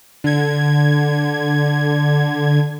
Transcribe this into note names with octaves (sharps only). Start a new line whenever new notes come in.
D3 G#6